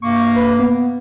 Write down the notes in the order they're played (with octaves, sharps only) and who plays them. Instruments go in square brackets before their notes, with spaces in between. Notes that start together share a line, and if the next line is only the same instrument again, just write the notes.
[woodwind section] G2 C3 A#3 [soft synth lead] C#6
[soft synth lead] B4
B3